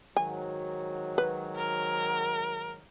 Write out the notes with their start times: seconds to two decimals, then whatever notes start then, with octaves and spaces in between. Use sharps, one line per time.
0.16 G#2 D#3 F#3 G#5
1.18 B4
1.56 A#4